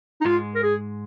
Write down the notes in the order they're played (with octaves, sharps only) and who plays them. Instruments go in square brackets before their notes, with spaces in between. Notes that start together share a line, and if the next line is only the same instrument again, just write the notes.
[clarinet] D#4
[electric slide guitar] G#2 G#3 [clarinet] F4
[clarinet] A#4
G#4